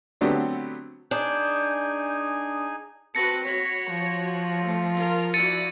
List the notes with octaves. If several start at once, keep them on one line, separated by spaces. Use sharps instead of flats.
D3 F#3 A3 B3 C4 G4
D4 D#4 G#4 G#5 G6
C4 F#4 B4 A5 A#6 C#7
F#4 C#5 B5
F3
A3
F4 A#4
E4 F#4 D5 A6 C#7 D#7